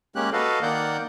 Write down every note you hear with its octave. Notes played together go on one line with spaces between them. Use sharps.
G#3 A#3 C#4 G4 F#6
F#4 A4 B4 D#5 F5
D#3 A#3 D5 F#5 G6